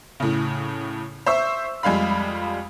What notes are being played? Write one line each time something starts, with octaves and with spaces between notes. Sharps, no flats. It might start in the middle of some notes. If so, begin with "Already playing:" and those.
A2 C#3
C5 E5 C#6 E6
F2 G3 G#3 F5 B5